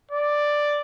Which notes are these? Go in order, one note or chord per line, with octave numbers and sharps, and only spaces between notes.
D5